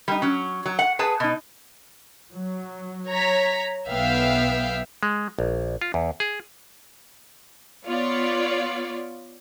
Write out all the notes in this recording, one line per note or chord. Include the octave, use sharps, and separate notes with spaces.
G3 D#4
F#3 C#4
F#3
F#5
G#4 B4 A5
B2 D#4
F#3
C#5 A#5 B6
B1 B3 E5 F5 G5
G#3
A#1
F4
E2
G#4
B3 F4 C#5 D5